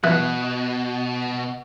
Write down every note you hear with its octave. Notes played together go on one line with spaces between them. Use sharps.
B2 E3 F#5